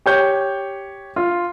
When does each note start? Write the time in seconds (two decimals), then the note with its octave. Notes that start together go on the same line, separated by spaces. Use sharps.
0.06 G4 C#5 G6
1.16 F4